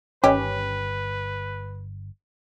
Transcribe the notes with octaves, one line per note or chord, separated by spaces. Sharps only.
G1 D#3 C#4 G4 B4